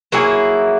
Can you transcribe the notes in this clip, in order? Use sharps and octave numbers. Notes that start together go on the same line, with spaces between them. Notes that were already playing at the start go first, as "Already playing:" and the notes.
F#3 A#3 E4 G#4